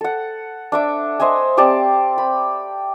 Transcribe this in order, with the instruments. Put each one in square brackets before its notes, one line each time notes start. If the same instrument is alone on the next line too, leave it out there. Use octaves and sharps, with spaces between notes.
[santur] A4 F#5
D4 E5 D6
C5 D#5 E5 G#5
C4 G4 D5 A5
B5